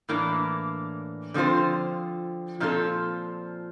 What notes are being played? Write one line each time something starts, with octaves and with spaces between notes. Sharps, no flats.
A2 E3 A#3 D4
D3 F3 C4 F4 C5
A#2 F3 C4 F4 A4